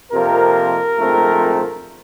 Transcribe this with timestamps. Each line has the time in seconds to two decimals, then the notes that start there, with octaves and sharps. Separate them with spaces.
0.12 F2 C3 F3 A#3 A#4
0.96 A#1 G#2 F3 A3 C4